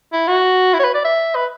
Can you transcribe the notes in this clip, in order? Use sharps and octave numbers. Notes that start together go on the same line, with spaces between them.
E4
F#4
E4
C#5
B4
D5
E5
B4